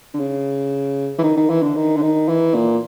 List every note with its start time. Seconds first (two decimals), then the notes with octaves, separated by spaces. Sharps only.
0.14 D3
0.19 C#3
1.18 E3
1.23 D#3
1.37 D#3
1.50 E3
1.62 D3
1.76 D#3
1.97 D3
2.02 D#3
2.28 E3
2.54 A#2